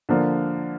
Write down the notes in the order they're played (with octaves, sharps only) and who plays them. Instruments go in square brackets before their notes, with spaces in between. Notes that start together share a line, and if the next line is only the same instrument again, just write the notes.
[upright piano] D3 F3 A#3